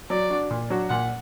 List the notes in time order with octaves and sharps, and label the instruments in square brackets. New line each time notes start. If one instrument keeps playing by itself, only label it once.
[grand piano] F#3 [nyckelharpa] D5
[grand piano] D4 F#4
A#2
F#3 D4 F#4
[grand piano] A#2 [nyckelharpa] F#5